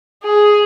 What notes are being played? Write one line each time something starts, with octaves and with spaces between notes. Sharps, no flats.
G#4